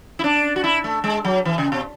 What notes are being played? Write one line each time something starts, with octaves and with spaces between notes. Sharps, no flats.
E4
D4
F#4
E4
A3
G#3
F#3
E3
C#3
B2